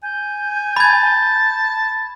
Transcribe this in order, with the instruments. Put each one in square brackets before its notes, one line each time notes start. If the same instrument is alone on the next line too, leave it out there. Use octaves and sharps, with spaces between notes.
[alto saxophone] G#5 [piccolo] G6
[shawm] A5 [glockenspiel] B5 G#6